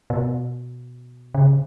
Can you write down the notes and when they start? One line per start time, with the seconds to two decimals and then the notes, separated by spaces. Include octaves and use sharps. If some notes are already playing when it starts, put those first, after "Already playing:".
0.10 B2
1.34 C#3